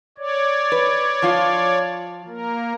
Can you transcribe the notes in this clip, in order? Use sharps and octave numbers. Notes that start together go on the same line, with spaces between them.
C#5 D5
B4
F3 F4
A#3 A#4